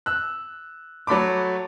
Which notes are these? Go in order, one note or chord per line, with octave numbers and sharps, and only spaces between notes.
E6 F#6
F#3 A3 B5 D6